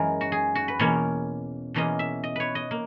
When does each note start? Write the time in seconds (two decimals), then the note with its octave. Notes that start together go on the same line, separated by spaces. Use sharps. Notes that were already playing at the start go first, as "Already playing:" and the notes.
Already playing: F#2 E3 G#3 G#4 A#4
0.21 F#4
0.32 G#4
0.55 F#4
0.68 B4
0.79 E2 B2 A#3 C#4 C#5
1.74 E2 B2 A#3 C#4 D#5
1.99 E5
2.24 D#5
2.36 B4 C#5
2.55 D#5
2.71 A#3